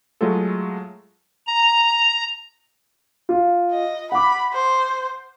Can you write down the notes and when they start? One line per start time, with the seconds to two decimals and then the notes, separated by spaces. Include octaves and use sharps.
0.21 F#3 G#3 A3 F4 A4
1.47 A#5
3.29 F4
3.71 D#5
4.12 F#5 B5 D6
4.53 C5